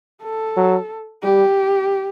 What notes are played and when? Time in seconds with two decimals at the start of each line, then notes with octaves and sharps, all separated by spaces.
0.23 A4
0.57 F#3
1.23 G3 G4